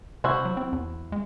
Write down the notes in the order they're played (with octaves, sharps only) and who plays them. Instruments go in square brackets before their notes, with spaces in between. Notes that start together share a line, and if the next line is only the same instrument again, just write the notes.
[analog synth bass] C3 [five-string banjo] E4 F#4 C5
[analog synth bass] F#3
C4
E2
G#3